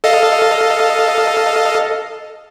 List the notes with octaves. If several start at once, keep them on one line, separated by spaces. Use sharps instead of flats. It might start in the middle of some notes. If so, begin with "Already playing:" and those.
A4 D#5 F5